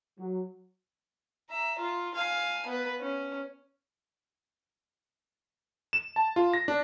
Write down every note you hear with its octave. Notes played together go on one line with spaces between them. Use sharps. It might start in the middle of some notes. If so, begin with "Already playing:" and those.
F#3
E5 A#5
F4
F5 G#5
B3 B4
C#4
E7
A5
F4
A#6
D4